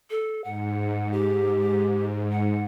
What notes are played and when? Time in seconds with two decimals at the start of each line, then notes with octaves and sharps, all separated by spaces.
0.10 A4
0.44 G#2 F#5
1.12 G4
2.32 F#5